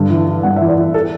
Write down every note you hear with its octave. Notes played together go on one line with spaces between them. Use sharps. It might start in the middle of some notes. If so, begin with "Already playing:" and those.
Already playing: G2 D3
E3
E3
G2 F#5
E5
E3
D5
E3
A4